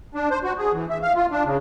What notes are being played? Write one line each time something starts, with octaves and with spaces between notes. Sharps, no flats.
D4
C5
F#4
G#4
E3
E5
F5
F4
D4
C#3